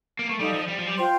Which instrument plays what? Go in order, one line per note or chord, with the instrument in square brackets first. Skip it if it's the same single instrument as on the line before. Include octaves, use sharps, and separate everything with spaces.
[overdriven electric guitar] A#3
A3
[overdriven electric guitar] G3 [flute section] D#4 A4 D5 F5
[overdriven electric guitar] F3
G3
F3
G3
[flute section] F4 C5 G5 C6